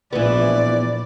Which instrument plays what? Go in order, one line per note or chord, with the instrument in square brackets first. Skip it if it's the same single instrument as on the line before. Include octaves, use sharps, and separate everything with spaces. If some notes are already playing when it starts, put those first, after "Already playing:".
[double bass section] A#1 [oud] E3 B3 [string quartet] D5